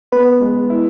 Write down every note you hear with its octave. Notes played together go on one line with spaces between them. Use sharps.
B3 B4
G#3
E4